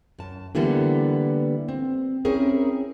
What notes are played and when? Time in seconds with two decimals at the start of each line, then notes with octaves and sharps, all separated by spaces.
0.19 F#2 A5
0.55 D3 E3 G3 A#3 B3
1.69 C4
2.25 C4 C#4 E4 G#4 A#4